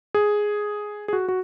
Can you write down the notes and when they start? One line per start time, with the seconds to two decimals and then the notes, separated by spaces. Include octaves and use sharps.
0.14 G#4
1.08 G#4
1.13 F#4
1.28 F#4